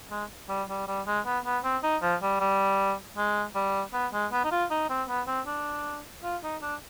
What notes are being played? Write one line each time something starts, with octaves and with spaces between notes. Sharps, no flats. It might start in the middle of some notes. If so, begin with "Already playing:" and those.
G#3
G3
G3
G3
G#3
B3
B3
C4
D#4
F3
G3
G3
G#3
G3
B3
G#3
B3
D#4
F4
D#4
C4
B3
C4
D4
F4
D#4
D4